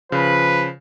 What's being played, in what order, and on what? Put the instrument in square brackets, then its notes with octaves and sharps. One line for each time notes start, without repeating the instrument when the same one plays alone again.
[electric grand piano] C#3 [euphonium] F3 [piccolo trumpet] B4